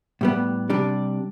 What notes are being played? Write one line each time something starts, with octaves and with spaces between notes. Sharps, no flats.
A2 G3 B3
C3 G3 D4